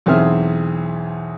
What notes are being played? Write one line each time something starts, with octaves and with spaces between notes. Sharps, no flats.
B1 E2 C4 G#4 E5 F6